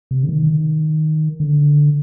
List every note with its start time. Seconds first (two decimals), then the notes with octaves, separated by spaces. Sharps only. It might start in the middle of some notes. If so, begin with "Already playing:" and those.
0.11 C3
0.23 D3
0.29 D#3
1.40 D3